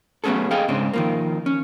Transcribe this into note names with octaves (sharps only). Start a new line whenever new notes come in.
F#3 A3 B3 C#4 G#4 A4
G#4 A4 D#5 F5 G5
G#2 C#3 C4 D4
D#3 F3 A#3
C#4